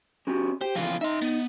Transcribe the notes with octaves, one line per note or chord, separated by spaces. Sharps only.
C#4 F#4 G4
G4 C5
F2 C#3 E3 F4
D#4 E5 C6
B3